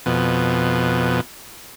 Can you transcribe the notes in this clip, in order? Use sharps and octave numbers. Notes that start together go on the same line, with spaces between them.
F2 B2